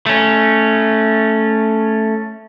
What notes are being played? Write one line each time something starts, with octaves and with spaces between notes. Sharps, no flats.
A3 C#4